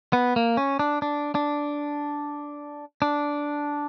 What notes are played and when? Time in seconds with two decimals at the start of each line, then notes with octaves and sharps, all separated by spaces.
0.13 B3
0.36 A#3
0.57 C#4
0.79 D4
1.02 D4
1.35 D4
3.02 D4